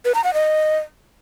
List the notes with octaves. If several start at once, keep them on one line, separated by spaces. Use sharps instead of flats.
B4
A#5
F#5
D#5